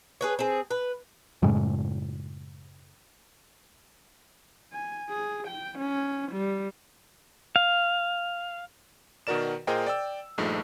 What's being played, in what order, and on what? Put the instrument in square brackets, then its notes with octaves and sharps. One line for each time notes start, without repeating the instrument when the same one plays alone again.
[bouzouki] G#4 B4 C#5
C4 G#4
B4
[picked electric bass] F#2 A2 C#3 G#3
[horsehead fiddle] G#5
G#4
G5
C#4
G3
[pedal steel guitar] F5
[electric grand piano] B2 D#3 F#4 A#4 D5 E7
A#2 G#4 A#4 C5 D#5 G5
D5 G5 E6
A#1 G2 F3 A3 D#4 G#4